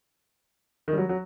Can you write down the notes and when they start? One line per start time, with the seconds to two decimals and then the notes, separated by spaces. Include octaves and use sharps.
0.88 D#3
0.93 G3
0.98 F#3
1.09 F#3